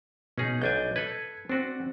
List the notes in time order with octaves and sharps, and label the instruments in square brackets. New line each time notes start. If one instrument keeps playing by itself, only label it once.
[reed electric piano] B2 [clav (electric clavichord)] C#4 D#4 G#4
[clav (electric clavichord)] B1 D4 G#5 [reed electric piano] G6
[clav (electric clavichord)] A4 B4 [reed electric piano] G#6
[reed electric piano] C4 [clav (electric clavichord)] D4 F#4